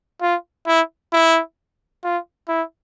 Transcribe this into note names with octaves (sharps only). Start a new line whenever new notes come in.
F4
E4
E4
F4
E4